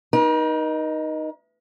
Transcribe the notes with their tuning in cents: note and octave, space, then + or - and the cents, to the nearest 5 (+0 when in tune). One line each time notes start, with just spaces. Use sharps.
D#4 +0 A#4 +45